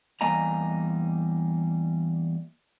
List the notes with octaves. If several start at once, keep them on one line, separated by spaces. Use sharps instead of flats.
E2 G3 A#3 D#5 G#5 A#5